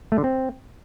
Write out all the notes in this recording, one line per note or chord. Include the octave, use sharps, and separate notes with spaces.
A3
D3
C4